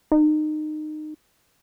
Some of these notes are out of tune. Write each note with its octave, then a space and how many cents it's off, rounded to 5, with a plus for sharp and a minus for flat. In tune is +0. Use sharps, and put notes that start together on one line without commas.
D#4 -25